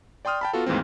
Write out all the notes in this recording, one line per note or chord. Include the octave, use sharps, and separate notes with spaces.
D5 G5 C6 D#6 F6
G5 A5 B5
B3 F4 F#4 A4
D#2 G#2 E3 A3 C4